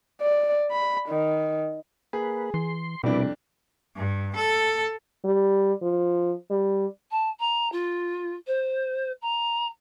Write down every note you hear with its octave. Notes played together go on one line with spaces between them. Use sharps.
D5
B5
D#3
A#3 G#4 B4
E3 C6
C2 F2 B2 D4 E4 B4 D5
G2
A4
G3
F3
G3
A5
A#5
F4
C5
A#5